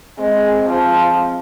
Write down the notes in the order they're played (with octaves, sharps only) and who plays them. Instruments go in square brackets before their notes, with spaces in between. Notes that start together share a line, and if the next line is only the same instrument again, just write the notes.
[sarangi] G#3 [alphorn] C4
[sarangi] F3